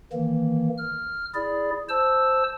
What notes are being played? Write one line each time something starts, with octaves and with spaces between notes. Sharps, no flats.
D#3 E3 A#3
F6
E4 G#4 D5
C5 A5 E6